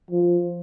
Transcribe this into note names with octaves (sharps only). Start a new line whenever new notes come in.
F3